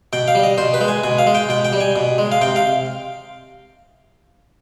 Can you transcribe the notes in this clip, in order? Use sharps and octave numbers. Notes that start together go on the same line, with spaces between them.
B2 G5
F5
G3
D#5
B2 C5
B4
G#3
G#5
B2 G#5
F5
G#3
G5
B2 G5
G5
G3
G#5
B2
G#3
F5
C3 G5
F5